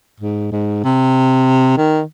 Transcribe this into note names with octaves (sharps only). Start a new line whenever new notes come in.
G#2
G#2
C3
D#3